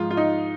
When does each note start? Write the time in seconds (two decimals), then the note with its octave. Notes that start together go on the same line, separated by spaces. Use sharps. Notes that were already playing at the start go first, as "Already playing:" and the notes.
Already playing: G#2 F3 G#3 F4
0.11 F4
0.17 D#4